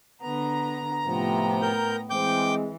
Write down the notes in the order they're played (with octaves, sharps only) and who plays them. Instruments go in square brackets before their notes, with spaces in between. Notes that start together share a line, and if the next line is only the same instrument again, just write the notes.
[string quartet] D3 B3 [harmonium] A#5
[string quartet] A2 B3 G5 [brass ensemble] C3 F3
[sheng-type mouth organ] A#4 G6
[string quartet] E3 [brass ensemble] G#3 C4 [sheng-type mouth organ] G5 D6 G6